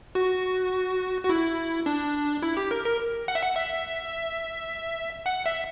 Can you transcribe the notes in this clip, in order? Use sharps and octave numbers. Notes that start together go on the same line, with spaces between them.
F#4
F#4
E4
D4
E4
G4
A#4
A#4
F#5
E5
F#5
E5
F#5
E5